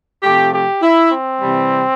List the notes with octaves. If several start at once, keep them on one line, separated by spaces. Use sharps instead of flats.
C3 F3 A3 G4
G4
E4
C4
C3 E3 G3